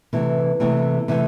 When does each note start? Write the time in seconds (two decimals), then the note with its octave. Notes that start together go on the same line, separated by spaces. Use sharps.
0.13 C3 E3 A3
0.60 C3 E3 A3
1.08 C3 E3 A3